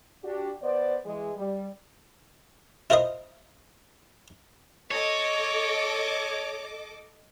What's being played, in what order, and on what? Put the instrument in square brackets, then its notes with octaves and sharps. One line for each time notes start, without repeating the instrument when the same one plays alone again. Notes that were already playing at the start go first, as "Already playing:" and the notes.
[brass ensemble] D4 F#4 G4
B3 C5 D5
E3 G#3
G3
[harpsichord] E4 F4 A#4 C5 D#5
[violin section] A4 D#5 D6 [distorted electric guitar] C#5